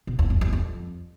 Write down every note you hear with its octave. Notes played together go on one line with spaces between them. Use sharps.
B2
E2
F#2
E2
F2